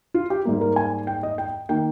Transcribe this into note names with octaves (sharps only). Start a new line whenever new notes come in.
F4
G4
G#2 G3 A#3
A#4
G#5
G5
D#5
G5
D#3 A#3 G5